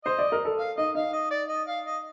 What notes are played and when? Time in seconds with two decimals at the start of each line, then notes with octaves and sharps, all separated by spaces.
0.05 C5 D#5
0.19 D5
0.32 A#4
0.45 A4
0.59 F5
0.78 D#4 D#5
0.95 D#4 F5
1.13 D#5
1.31 D5
1.49 D#5
1.67 F5
1.86 D#5